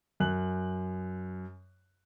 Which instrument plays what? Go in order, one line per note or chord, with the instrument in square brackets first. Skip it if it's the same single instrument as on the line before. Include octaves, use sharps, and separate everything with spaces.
[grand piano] F#2 F#6 F#7